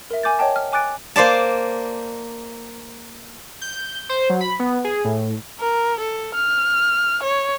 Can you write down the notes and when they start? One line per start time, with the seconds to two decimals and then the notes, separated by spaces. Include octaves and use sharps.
0.11 A#4 E5
0.23 G#5 D6 G6 A6
0.39 C#5 D#5 G5 A5
0.56 F6
0.73 G#5 D6 F#6 A6 D7
1.16 A#3 C5 D5 A5
3.61 G6
4.09 C5
4.30 F#3
4.41 B5
4.59 B3
4.84 G#4
5.05 A2
5.59 A#4
6.00 A4
6.35 F6
7.23 C#5